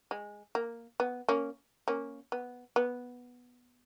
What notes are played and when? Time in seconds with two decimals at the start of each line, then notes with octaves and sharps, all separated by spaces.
0.11 G#3
0.55 A#3
1.00 B3
1.29 A#3 C#4
1.88 A#3 C#4
2.32 B3
2.76 B3